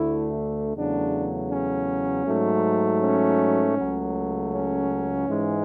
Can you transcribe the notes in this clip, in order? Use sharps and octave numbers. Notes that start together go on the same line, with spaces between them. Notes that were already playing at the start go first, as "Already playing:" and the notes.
Already playing: D2 D3 A3 E4
E2 C#3 F#3 A3 D4
C#4
G#2 F#3 A3
C#4
C#2 C#3 F#3 A3
C#4
G#2 E3 G#3